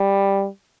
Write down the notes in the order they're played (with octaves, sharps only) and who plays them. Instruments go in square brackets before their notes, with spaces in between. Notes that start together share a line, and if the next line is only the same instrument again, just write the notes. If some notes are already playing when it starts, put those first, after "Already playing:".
Already playing: [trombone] G3